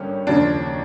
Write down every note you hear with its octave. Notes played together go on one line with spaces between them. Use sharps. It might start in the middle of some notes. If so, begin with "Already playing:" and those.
Already playing: G#1 G2 D3 G3 A#3 C#4
D#2 C#3 F3 D4